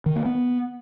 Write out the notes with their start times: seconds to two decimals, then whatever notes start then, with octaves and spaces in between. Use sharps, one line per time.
0.06 D#3
0.16 A#3
0.25 B3